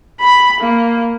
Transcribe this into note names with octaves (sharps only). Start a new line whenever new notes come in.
B5
A#3